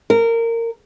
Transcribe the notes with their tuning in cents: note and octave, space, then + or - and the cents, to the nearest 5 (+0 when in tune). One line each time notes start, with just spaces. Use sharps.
A#4 -20